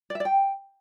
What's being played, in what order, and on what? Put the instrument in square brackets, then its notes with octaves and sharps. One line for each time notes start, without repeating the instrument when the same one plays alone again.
[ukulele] D5
E5
D5
G5